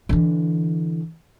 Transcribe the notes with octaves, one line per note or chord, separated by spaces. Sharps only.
D3 E3